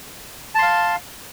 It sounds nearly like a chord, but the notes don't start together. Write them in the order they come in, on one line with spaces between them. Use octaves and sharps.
A5 C6 F5